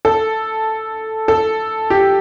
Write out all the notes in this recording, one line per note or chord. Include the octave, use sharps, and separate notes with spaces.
A4
A4
G4